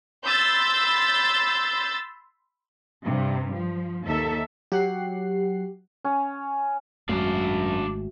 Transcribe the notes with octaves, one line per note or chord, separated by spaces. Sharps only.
B5 C6 E6 G6 A6
G2 C3
F3
D#2 A4 E5
F#3 G4 F#5 C7
C#4
G#1 F#2 G#3 A3 D4 F#4 E5 F5